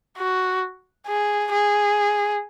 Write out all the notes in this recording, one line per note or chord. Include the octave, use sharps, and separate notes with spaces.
F#4
G#4
G#4